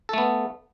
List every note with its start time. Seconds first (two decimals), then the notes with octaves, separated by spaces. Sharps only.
0.09 A4
0.13 A3
0.18 B3